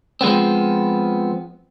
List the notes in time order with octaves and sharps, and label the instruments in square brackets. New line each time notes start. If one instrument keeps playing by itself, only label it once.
[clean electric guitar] F3 G#3 B3 C4